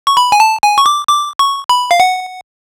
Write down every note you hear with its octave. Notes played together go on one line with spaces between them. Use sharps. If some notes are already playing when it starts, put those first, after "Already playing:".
C#6
B5
G#5
A5
G#5
C#6
D6
D6
C#6
B5
F5
F#5